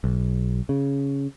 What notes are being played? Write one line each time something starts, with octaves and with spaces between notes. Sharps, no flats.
B1
C#3